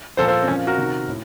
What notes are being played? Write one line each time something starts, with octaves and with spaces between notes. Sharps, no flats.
A#2 F3 A4 C5
A4 C5
C4
A#2 F3 C#4
F#4 A#4
C3 D#3
A2